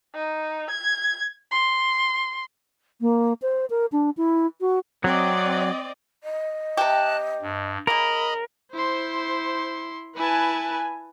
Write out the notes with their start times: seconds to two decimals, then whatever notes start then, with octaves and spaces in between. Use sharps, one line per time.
0.15 D#4
0.71 G#6
1.51 C6
3.01 A#3
3.42 C5
3.70 A#4
3.92 D4
4.17 E4
4.61 F#4
5.04 F#3 C4 D5 D#5
6.23 D#5
6.77 C3 G4 A5 F#6
7.42 G2
7.87 C#3 A#3 A#4 D#5 B5 D#6
8.73 E4 C5 C6
10.16 E4 B4 G#5 A5